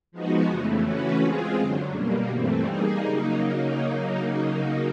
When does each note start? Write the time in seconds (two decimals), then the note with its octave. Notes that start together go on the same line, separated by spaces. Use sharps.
0.12 F3 G#3 B3 D#4 F#4
0.48 F2 C#3 E3 A3
0.84 E3 A3 C#4 F#4 B4
1.20 G#3 C4 F4 G#4
1.56 F#2 D3 F#3
1.93 B2 G3 A#3
2.29 G2 E3 A3 C4
2.64 G3 A#3 D#4 G#4
3.01 C#3 F#3 A#3 D#4